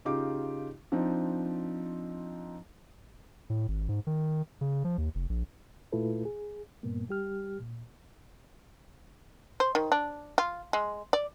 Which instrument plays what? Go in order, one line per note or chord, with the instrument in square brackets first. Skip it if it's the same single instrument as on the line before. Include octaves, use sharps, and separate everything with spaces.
[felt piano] C#3 D#4 F4 G4 D6
F3 C4 D4 D#4
[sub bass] A2
G#1
G#2
D#3
C#3
F3
D#2
F1
A#1
[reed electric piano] A#2 A3 E4 F4 A4 B4
G#4
G2 A#2 A#3 B3
G3 G4 F6
A#2
[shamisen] C5
D#3
D4
F4
G#3
D5